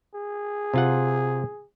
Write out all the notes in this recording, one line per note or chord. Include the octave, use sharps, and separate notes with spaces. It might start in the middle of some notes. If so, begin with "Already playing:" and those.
G#4
C3 F4 F#5